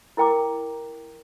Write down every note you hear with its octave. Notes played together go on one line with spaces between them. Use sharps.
E4 A#4 G5 A#5 D6